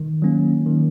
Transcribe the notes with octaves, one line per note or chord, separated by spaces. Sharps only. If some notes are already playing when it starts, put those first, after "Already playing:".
Already playing: D#3
F#3 A#3 C#4
D#3